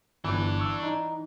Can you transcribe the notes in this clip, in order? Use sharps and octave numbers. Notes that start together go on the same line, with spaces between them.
G1 E3 D4 G5
C#6 E6
D#4